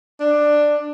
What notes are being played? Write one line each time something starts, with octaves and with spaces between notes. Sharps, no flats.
D4